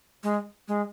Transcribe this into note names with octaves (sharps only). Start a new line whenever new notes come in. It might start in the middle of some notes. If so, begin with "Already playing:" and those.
G#3
G#3